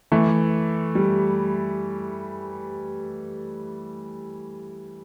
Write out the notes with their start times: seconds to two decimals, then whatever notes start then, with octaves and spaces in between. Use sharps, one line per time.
0.12 E3 A3
0.95 G3